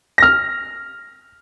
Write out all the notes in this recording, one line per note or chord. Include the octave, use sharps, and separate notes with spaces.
F6 A#6